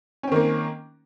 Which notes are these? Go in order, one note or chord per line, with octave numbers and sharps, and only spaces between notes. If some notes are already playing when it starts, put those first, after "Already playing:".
D#3 A#3 C4 C#4